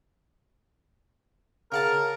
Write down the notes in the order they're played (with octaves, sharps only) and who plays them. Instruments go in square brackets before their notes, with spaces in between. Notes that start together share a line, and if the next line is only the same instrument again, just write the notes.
[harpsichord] C#3 F#5 A5 [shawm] A#4